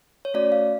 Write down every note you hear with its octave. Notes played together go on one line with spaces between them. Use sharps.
C#5
A3 C#4 F#4 D5
F5